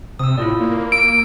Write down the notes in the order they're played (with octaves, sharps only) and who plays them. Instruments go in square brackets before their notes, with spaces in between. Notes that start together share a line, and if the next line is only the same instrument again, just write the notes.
[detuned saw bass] C3 [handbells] D#6 E6
[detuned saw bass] A2 [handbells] E4 F4 D5
[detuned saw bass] A#3
[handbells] E6 [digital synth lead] D7